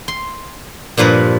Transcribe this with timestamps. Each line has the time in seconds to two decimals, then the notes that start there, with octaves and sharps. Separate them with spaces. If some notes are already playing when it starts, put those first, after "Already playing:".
0.08 C6
0.97 G2 A#2 F3 B4 A#5